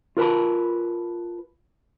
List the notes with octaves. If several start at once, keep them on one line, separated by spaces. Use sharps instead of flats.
F4 A#4 B4 A5 B5